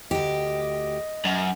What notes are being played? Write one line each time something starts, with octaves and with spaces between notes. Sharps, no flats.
D2 G4 D#5
F#2